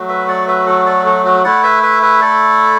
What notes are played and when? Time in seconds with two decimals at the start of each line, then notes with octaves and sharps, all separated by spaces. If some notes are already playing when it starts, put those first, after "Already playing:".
Already playing: F#3 A3 F#4
0.09 B4 E5
0.28 D5 F#5
0.48 B4 E5
0.67 A4
0.86 A4 D5
1.06 A4
1.26 F#4
1.44 A3 E4 D5 F#5
1.63 B4 E5
1.83 B4 E5
2.03 B4 E5
2.21 A4 D5